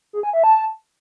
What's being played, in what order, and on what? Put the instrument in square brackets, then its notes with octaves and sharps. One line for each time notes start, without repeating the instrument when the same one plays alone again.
[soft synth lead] G#4
G#5
E5
A5